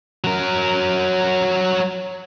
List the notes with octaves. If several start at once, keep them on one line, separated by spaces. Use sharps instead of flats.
F#3 A#4